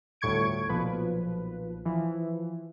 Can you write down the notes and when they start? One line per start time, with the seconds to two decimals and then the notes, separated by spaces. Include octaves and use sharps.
0.21 G1 D2 A2 C#6 G#6 D7
0.69 B1 A#2 F3 B4
1.85 E3 F3